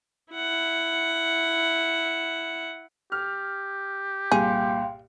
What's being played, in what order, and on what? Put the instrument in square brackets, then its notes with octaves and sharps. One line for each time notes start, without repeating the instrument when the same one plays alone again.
[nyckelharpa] E4 F#5
[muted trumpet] G4 [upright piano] F6
[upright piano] C2 G2 A#2 [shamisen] G#4 [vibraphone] F5 G5 C6